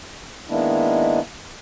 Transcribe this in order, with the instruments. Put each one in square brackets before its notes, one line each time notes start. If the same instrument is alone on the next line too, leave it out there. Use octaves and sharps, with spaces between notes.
[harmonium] D#3 G#3 A#3 B3 D4 E4